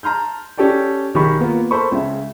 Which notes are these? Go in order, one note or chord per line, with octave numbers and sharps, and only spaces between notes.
A5 A#5 C6 F6 G6
C#4 G4 A4 D5 G5
B1 D#3 G4 G#4 B5 C#6
A#3 B3 F4
A4 A#4 C5 B5 C#6
C#2 C#3 E5